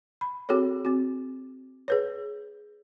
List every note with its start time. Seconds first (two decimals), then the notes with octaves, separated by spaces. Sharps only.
0.21 B5
0.49 C4 F#4 G#4 A4 C#5
0.85 C4 F#4
1.88 G#4 B4 C#5